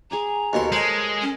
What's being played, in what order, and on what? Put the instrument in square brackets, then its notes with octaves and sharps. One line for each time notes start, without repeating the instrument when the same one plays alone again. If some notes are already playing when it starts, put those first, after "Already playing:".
[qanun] G#4 G#5 D6 [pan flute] A#5
[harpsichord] D#2 B2 C6 [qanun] A4 A#4 C#5
[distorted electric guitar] G#3 [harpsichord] C5 G#5
[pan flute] C#4